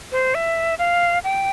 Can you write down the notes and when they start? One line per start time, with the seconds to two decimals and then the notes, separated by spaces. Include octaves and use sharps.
0.12 C5
0.35 E5
0.79 F5
1.24 G5